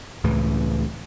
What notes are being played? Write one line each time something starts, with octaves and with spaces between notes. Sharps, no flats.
C#2 A2 C#3 E3